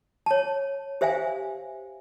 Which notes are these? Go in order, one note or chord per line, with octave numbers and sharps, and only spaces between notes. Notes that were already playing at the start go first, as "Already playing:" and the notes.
C#5 A5
G4 C5 E5 F5 G#5